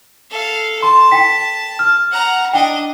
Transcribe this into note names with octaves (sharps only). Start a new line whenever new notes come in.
A4 F5
A5 C6
G5 B6
F6
F#5 A#5
D4 D#5 G5